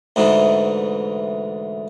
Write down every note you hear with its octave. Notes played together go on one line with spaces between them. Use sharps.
D2 G#2 E3